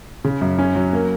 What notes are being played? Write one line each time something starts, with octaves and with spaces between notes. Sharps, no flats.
C#3
F#2
C#4
F#3
A#3